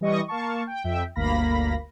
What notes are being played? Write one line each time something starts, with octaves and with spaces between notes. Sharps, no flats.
E3 G3 D#5 C#6 D#6
A#3 F5 A5 C#6
G5
F2 E5 G5
G1 D2 A#3 F5 B5 A#6